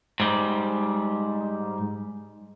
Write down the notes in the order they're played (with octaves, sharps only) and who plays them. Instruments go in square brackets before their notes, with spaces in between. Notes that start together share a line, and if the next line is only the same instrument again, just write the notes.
[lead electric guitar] G#2 G3